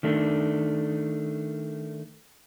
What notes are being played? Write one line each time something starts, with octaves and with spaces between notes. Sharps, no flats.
D#3 A3 D4